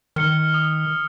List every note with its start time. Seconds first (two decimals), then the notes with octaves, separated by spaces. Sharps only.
0.16 D#3 F6 C#7 G7
0.54 D#6